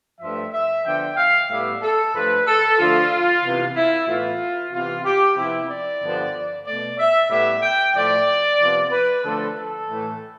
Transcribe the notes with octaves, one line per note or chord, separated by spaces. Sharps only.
G2 F3 A3 E5
E5
D3 F3 B3 G5
F5
A2 G3 B3 E5
A4
G2 F3 A3 B4
A4
D3 F3 A3 F4
C3 E3 B3
E4
A2 E3 B3 F4
C3 E3 B3 F4
G4
C3 F3 B3 E4
D5
G2 D3 F3 B3
B2 A3 D5
E5
A2 G3 B3 E5
G5
A2 F3 A3 D5
C3 F3 B3
B4
D3 F3 A3 A4
A4
A2 E3 A3